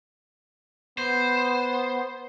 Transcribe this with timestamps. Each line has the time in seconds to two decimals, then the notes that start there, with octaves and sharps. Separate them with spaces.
0.98 B3 C5